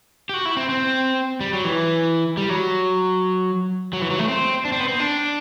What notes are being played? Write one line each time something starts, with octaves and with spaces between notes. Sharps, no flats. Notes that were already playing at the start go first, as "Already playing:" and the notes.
G4
F#4
E4
C4
C4
G3
F#3
E3
G3
F#3
F#3
E3
F#3
A3
C4
D4
C4
B3
C4
D4